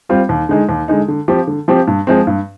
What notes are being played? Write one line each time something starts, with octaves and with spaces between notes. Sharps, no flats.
G3 C4 F4
D#2
D3 G#3 D#4
D#2
D3 G#3 D#4
D3
F3 C4 G4
D3
F3 C4 G4
G2
F3 G#3 C4
G2